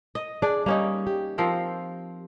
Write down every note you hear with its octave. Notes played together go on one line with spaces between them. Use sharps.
D#5
D4 G#4 D5
G3 A#3 C#4 D#4
G4
F3 C4 A#4